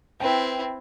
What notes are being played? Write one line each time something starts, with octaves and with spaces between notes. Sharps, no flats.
C4 E4 B4 G5